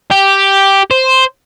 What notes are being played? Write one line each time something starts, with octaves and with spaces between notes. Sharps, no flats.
G4
C5